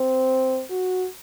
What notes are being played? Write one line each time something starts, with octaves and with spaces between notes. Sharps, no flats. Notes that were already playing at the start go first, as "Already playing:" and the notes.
Already playing: C4
F#4